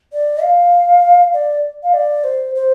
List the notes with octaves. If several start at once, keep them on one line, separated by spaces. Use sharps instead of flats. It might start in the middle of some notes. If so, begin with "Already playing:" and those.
D5
F5
D5
F5
D5
C5
C5